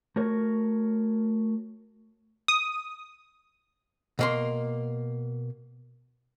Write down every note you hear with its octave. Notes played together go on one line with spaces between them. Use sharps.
A3 F#4 A#4 C#5
D#6
B2 A#3 C6